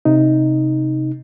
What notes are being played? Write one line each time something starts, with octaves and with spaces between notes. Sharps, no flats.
C3 D#4